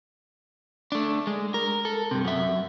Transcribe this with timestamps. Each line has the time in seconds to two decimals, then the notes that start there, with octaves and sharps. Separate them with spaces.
0.92 A3 D4
1.27 G#3
1.54 A#4
1.85 A4
2.11 G2 C3
2.25 F#2 E5